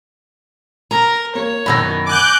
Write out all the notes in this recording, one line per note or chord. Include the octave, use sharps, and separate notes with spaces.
A#4 A#5
A#3 C#5
F#2 B2 D#3 B5 E6 A#6
G#5 D6 F#6 G6